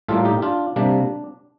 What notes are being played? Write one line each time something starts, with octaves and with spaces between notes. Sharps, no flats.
A2 G3 A#3 F4 A4
D#4 G4
D4 F4
C3 G3 A#3 D4